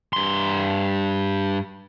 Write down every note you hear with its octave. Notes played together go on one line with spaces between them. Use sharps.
G2 C6